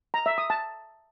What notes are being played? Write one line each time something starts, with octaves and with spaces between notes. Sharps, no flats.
A#5
E5
D#6
A5